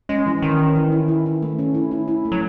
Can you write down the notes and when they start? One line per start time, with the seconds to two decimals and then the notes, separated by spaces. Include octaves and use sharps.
0.09 G#3 C#4
0.26 E3
0.42 D#3 C#4
0.59 C#4
0.75 E3
0.92 E4
1.08 E4
1.26 E4
1.43 A3
1.59 C#4
1.74 E4
1.91 E4
2.08 E4
2.25 A3
2.32 F#3